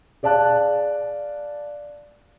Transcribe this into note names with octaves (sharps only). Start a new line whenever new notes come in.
G#4 D5 F5 A5 F#6